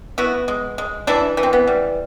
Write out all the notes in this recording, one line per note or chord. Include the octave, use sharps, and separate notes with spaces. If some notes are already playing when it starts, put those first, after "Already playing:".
B3 E4 F#4
G#3
G#3
E3 D4 E4
E3
C4
B3
G3